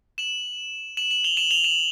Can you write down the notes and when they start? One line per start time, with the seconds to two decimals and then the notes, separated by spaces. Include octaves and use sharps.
0.18 E7 F#7
0.97 E7 F#7
1.11 E7 F#7
1.24 F7 G7
1.37 E7 F#7
1.51 F7 G7
1.64 E7 F#7